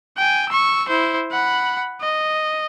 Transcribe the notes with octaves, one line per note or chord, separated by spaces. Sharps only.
G5 G#5
C#6 E6
E4 C5
F#5 B5
D#5